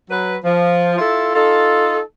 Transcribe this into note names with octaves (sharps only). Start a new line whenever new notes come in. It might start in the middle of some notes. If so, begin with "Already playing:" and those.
F#3 B4
F3
E4 F4 A4
D#4 F4 A4